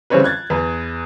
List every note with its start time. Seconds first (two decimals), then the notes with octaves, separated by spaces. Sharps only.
0.10 C#3 E3 G3 C4 C#4 B4
0.24 F#6 G#6 A6
0.50 E2 B4